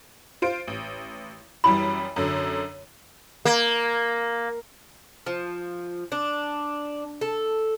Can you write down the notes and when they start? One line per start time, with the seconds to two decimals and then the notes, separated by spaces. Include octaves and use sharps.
0.42 F4 C5 D7
0.68 A1
1.64 F#2 E3 G3 B5
2.16 F#2 D3
3.45 A#3
5.26 F3
6.12 D4
7.21 A4